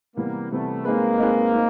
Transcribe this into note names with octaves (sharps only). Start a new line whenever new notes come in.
C3 E3 G3 A#3 B3
C3 E3 G3 A3 B3
G#3 A#3 C4 D#4 G#4 B4
G#3 C4 D#4 G#4 B4
C4 D#4